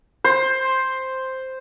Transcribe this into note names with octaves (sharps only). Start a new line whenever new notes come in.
C5